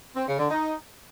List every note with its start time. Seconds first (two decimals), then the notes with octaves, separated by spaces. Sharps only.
0.16 C4
0.27 C#3
0.39 D3
0.50 D#4